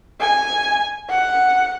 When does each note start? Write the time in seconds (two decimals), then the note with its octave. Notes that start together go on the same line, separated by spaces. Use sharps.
0.20 G#5
1.09 F#5